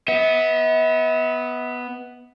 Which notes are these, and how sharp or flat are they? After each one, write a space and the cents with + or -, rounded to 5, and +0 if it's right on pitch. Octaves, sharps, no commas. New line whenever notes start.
B3 +0 E5 -45